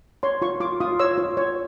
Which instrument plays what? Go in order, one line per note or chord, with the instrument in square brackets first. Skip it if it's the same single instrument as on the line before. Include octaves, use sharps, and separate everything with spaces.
[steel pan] C#5 C6
F4 C#6
F4 D6
F4 D#6
C#5 E6
F4
C#5